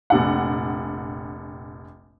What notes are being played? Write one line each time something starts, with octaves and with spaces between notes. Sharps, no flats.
F1 A#1 F#5